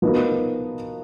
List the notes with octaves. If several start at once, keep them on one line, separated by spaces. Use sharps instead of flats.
F3 B3 D#4 F#4 A#4